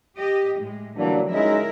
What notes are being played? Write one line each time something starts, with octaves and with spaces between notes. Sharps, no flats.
G4 D#5
A2 G#3
D3 E3 F#3 G3 A#3 D4
G#3 C#4 D#4 E4 A#4 E5